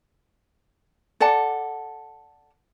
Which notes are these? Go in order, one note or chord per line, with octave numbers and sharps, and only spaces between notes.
A4 D5 F#5 A5